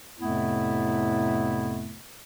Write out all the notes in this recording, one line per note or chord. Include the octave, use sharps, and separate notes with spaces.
F2 A2 C3 A3 B3 E4